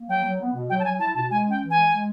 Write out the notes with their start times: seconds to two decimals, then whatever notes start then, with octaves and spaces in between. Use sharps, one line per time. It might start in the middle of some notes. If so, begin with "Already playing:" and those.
Already playing: A#3
0.09 F#3 G5
0.24 F#3
0.40 B3
0.54 B2
0.70 F#3 G5
0.80 A5
0.84 F#3 G#5
0.99 E4 A5
1.15 B2 A5
1.30 G#3 G#5
1.45 C#4
1.50 G5
1.60 E3
1.70 G#5
1.76 G#3
1.90 G#3